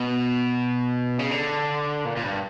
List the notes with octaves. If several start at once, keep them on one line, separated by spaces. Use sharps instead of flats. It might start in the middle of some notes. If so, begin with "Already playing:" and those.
Already playing: B2
C#3
D3
A#2
A#2
G2